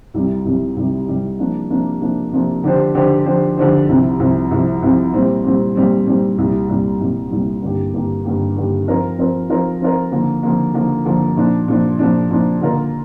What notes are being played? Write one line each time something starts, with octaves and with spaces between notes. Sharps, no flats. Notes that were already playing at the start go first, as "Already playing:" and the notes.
C2 C3 G3
C2 C3 G3
C2 C3 G3
C2 C3 G3
C3 F3 A#3 D4
C3 F3 A#3 D4
C3 F3 A#3 D4
C3 F3 A#3 D4
D3 F3 D4 G4 C5
D3 F3 D4 G4 C5
D3 F3 D4 G4 C5
D3 F3 D4 G4 C5
C2 C3 F3
C2 C3 F3
C2 C3 F3
C2 C3 F3
A#2 G3 C4
A#2 G3 C4
A#2 G3 C4
A#2 G3 C4
C2 A#2 G3
C2 A#2 G3
C2 A#2 G3
C2 A#2 G3
G2 D3 A#3 G4
G2 D3 A#3 G4
G2 D3 A#3 G4
G2 D3 A#3 G4
F3 C4 F4 A#4
F3 C4 F4 A#4
F3 C4 F4 A#4
F3 C4 F4 A#4
D3 F3 A#3
D3 F3 A#3
D3 F3 A#3
D3 F3 A#3
A#2 F3 D4
A#2 F3 D4
A#2 F3 D4
A#2 F3 D4
D3 A#3 F4 A#4